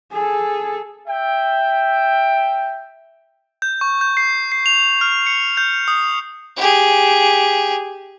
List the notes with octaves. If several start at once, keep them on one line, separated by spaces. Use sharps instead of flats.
G#4 A4
E5 G5
G6
C#6
G6
C7
C7
F7
F6
C#7
G6
D#6
G4 G#4